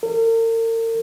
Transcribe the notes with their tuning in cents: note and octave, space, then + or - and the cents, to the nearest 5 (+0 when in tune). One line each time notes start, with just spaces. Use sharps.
A#4 -45